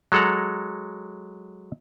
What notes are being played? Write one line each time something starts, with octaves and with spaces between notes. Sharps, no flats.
F#3 G#3 A4 F#5 A#5